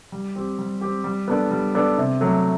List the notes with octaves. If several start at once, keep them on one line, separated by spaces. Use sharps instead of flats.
G3
C4 G4
G3
C4 G4
G3
B3 D4 A4 D5
G3
B3 D4 A4 D5
C3
F#3 A3